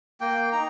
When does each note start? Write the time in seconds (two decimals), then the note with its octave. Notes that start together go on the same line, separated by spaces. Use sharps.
0.21 A#3 G5
0.52 D#4 A#5